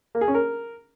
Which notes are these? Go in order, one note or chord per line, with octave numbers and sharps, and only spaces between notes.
A#3
G#4
C#4
A#4